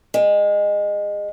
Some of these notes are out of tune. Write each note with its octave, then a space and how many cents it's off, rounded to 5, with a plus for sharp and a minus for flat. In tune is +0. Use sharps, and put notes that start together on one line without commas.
G#3 -25